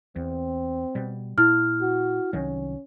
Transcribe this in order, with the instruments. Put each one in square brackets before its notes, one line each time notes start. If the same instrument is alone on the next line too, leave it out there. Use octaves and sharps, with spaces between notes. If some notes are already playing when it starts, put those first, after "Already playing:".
[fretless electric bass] E2 [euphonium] C4
[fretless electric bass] B2 G3
[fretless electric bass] A#2 [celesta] E4 F6
[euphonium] F#4
[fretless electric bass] C2 D#3 F#3 [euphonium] C#4